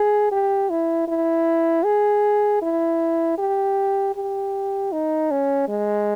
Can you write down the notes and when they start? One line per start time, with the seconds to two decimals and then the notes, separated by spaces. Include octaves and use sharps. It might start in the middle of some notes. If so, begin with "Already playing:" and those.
Already playing: G#4
0.31 G4
0.70 E4
1.08 E4
1.84 G#4
2.62 E4
3.39 G4
4.15 G4
4.92 D#4
5.31 C#4
5.68 G#3